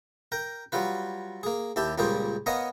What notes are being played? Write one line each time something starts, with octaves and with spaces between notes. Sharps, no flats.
A#4 G5
F#3 G3 F4 B4
A#3 G#4
D#2 E4 G4 A5
C#2 A#2 G3 A#3 G#4 C5
B3 A#4 C#5 D#5 F5